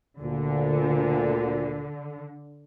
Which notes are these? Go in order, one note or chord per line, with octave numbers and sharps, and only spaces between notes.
D2 A#2 D3